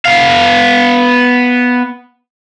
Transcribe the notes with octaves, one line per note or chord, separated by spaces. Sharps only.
B3 F5